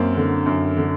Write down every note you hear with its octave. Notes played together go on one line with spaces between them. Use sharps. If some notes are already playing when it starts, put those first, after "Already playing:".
Already playing: F#2 A#3 C4
D3
F#2
D3